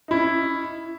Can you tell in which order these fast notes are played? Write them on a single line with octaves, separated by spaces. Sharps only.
D#4 E4 C#4